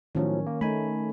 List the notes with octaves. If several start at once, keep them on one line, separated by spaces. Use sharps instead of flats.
A2 D#3 F3 F#3 C#4
A#3
A3 D#4 G#5 B5